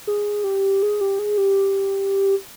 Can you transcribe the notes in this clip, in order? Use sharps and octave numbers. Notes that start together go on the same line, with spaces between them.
G#4
G4
G#4
G4
G#4
G4